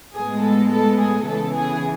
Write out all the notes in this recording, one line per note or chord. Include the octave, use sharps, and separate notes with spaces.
A2 G#3 B3 G#4
A4
A4
G#4
C#3 E3 B3 A4
G#4